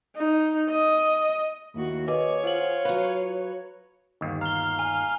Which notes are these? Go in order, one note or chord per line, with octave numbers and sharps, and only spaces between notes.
D#4
D#5
D#2 E4 F#4
A#3 G#4 B4 C#5 D#5 D6
F4 C5 F#5 F#7
F#3 B4 F5
G1 D#2
F5 A#5 G7
G#5